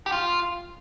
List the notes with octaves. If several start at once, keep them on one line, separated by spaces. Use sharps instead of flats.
G4
F4